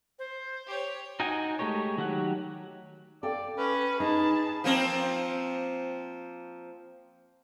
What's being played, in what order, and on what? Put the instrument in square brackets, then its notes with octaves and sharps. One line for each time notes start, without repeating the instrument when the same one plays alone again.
[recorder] C5
[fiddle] G4 C#5
[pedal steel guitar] D#4 F#4 D#5 G5 G#5
G#3 A3 G4 A#4 C#5
D#3 F#3 G4 F#5 F#6
[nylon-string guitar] A4 F5 G5 [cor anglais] D5
[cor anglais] C#4 [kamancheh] B4
[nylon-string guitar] D#4 [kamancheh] G#4 A5 [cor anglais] B4
[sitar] F3 A#3 C4